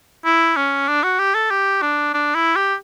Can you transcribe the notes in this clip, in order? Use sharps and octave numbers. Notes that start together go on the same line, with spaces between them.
E4
C#4
D4
F#4
G4
A4
G4
D4
D4
E4
G4